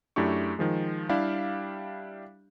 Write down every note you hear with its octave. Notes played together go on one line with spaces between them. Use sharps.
F#2 A3 D4 E4 G4 C#6
D#3 F3 G#3
G3 D4 E4 G4 F5